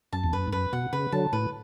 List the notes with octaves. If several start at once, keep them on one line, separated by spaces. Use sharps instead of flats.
F#2 A5
E2
F#2 B4
G#2
F#2 B4
B2 F#5
C#3 B4
D3 F#3 A5
A2 B4